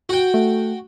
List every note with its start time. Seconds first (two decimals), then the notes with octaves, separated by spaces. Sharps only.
0.09 F#4 G5
0.34 A3